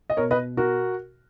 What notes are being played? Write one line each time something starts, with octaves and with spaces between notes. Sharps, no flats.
D#5
B2 A#4 C#5
B4 D#5
F#4 A#4